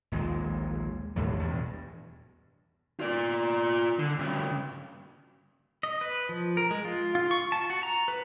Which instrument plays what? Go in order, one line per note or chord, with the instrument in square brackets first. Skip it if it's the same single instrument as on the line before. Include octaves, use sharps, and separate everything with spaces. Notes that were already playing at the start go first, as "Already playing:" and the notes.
[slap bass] A#1 D#2 A#2 G#3
A#1 D#2 A2 F#3
E2 G2 B2
[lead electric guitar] F4 D5
D3
G2 C#3
[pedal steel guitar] D#5
B4
F3
A#4
G#3
F4
F4
C#6
A5
F#4
A#5
B4